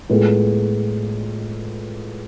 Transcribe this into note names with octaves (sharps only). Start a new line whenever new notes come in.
A2 G#3 B3 F4 G#4